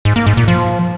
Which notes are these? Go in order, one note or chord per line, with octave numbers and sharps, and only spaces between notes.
G#2
A#3
G#2
A#2
F3